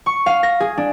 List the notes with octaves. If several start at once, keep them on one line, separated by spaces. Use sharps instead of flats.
C#6
F5
A#6
G#4
D4